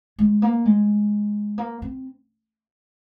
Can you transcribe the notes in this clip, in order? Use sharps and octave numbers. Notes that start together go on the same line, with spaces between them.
G#3
A#3
G#3
A#3
C4